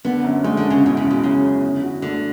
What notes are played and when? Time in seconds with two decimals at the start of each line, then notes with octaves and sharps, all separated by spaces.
0.05 D3 B3
0.24 F#2
0.44 G#3 A3
0.57 D3
0.64 F#2
0.70 C#3
0.83 E2 B2
0.97 C#3
1.04 E2
1.11 B2
1.23 C#3 F#3
1.43 E2
1.63 D3
1.83 F#4
2.02 D3 A3